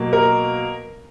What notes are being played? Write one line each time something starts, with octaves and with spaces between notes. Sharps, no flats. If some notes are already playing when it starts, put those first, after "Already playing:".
Already playing: B2 F#3 A#3
A#4